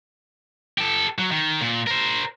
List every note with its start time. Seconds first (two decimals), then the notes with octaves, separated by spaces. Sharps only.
0.78 G4 A4
1.19 F#3
1.31 D#3
1.61 A#2
1.87 A#4 C5